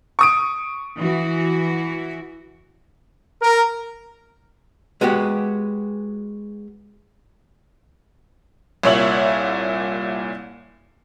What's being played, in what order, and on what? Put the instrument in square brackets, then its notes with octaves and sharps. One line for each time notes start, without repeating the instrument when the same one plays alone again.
[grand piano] C#6 D#6 D7
[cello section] E3 F#4
[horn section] A#4
[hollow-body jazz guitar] G#3 B3 F#4 G4
[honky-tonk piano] C2 A#2 C#5 E5 F#7